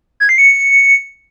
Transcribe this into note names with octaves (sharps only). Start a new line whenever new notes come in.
G#6
C7
C#7